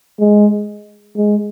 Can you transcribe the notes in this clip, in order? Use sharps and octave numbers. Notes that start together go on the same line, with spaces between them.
G#3
G#3